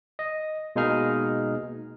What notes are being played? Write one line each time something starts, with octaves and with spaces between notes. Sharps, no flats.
D#5
B2 G#3 A#3 D#4 G#4 F6